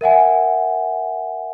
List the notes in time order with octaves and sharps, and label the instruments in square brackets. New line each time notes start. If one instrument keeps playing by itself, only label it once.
[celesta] A#4 E5 F#5 G#5